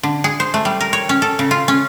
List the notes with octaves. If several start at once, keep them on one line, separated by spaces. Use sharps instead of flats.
D3
G#4
C5
A3
G3
A#4
C#5
C#4
A4
C#3
F4
C#4